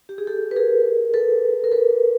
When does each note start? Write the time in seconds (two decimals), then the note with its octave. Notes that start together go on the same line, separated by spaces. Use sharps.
0.09 G4
0.18 G#4
0.27 G4 A4
0.51 B4
0.56 G#4 A#4
1.14 A4 B4
1.64 A#4
1.72 A4 B4